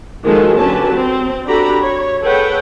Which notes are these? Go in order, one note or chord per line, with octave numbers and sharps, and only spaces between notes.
D#3 F3 G#3 F#4 G#4 A4
D3 F#3 C#4 G4 B4 A5
C4
D4 F#4 G4 A4 A#5 B5
C#5
G#4 A4 B4 C#5 F#5 G5